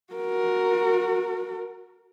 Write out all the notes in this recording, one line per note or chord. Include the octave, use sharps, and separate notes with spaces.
F#4 A#4